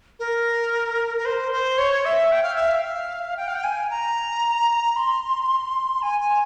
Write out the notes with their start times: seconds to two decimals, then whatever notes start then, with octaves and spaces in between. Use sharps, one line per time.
0.19 A#4
1.18 A#4
1.25 C5
1.52 C5
1.78 C#5
2.05 E5
2.32 G5
2.43 F5
2.56 E5
2.68 F5
3.37 G5
3.48 F5
3.56 G5
3.64 G#5
3.90 A#5
4.96 C6
6.02 G#5
6.20 G#5